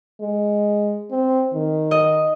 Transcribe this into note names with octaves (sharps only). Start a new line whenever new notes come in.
G#3
C4
D#3
D#5